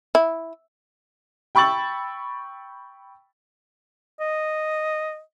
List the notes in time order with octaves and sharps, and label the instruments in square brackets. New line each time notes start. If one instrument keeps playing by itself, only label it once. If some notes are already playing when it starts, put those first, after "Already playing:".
[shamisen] E4
[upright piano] G5 B5 C#6 E6 A6 F#7
[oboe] D#5